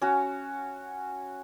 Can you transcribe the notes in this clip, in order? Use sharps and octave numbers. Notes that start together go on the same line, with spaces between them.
C#4 F#4